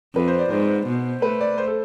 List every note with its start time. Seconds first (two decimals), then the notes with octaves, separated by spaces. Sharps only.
0.15 F2 B4
0.28 C5
0.39 D5
0.50 G#2 C5
0.87 B2
1.22 A3 B4
1.40 D5
1.58 C5
1.67 A4